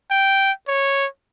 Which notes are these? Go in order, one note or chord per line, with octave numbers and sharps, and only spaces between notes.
G5
C#5